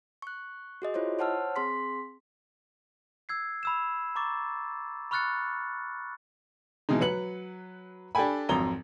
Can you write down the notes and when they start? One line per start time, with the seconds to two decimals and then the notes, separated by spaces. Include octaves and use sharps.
0.22 C#6 F#6
0.82 F#4 G#4 D#5
0.94 E4 F4 C5 C#5 D#5
1.19 C5 C#5 F#5 A5 E6 F6
1.56 C4 G#4 C6 B6
3.29 E6 G#6 C7
3.63 B5 E6 E7
4.16 A#5 C#6 D6 A6
5.11 B5 C#6 F6 F#6 A6 C#7
6.89 B2 E3 G#3 D#4
7.01 F#3 B4 C#7 F#7
8.15 D4 G4 A4 G5 G#5 B5
8.49 G#1 F2 F#3 A#5 G7